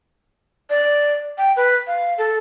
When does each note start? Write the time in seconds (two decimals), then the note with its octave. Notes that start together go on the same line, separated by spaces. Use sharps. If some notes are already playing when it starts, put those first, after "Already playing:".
0.70 D5
1.38 G5
1.57 B4
1.87 F5
2.18 A4